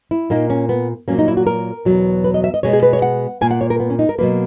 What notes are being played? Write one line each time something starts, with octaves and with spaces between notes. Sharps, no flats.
E4
A#2 A#3 D#4
C#4
B3
A#2 F#3 A#3 C#4
D#4
E4
F#4
A#4
E2 B2 F#3
B4
D#5
E5
D#5
B2 G#3 B3 C#5
G#4
B4
C#5
F#5
A#2 A#3 G#5
F#5
C#5
A#4
B3
C#4
D#4
A#4
B2 F#3 A#3 B4